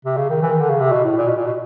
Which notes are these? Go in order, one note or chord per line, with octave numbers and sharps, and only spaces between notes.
C3
C#3
D#3
E3
D#3
D3
C#3
C3
B2
A2
A#2
B2
A#2
B2